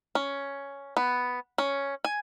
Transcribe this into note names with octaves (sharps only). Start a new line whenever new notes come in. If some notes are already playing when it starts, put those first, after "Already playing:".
C#4
B3
C#4
G#5